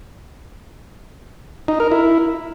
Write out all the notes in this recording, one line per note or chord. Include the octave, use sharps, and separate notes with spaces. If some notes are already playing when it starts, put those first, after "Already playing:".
D#4
A#4
E4